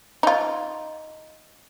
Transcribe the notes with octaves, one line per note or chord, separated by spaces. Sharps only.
D#4 F4